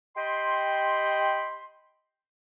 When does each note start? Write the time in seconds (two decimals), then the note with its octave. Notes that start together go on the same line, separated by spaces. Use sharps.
0.17 G4 D#5 G5 B5 C6